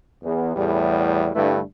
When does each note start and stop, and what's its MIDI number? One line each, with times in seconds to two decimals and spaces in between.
0.23 0.53 40
0.56 1.28 40
0.56 1.28 45
0.56 1.28 55
1.35 1.60 43
1.35 1.60 50
1.35 1.60 55
1.35 1.60 57
1.35 1.60 64
1.35 1.60 71